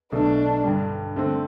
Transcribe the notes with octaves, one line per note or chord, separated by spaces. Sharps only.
B1 B2 A3 D4
G2 D3 G3
D3 A3 C4